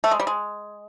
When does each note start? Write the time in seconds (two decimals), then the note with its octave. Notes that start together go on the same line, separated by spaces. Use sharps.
0.04 A3
0.11 G#3
0.20 G3
0.27 G#3